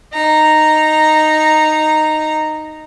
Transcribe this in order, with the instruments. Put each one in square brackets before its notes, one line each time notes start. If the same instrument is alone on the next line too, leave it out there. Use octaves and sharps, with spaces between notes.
[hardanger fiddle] D#4 A#5